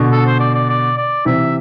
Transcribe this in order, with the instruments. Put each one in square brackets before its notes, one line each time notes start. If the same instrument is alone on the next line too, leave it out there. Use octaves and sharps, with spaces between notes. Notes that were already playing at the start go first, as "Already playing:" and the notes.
Already playing: [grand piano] B2 D3
[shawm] A4
C5
D5
D5
D5
D5
[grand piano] C3 E3 [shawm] E5